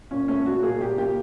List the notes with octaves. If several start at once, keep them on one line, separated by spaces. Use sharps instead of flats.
A#2 C#4
A3 C#4
A#2 F#4
A#2 G#4
A#2 G4
A#2 G4